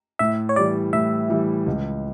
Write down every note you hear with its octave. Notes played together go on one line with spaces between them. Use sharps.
A2 E5
C#5
E3 G3 D5
A2 E5
E3 G3
C#2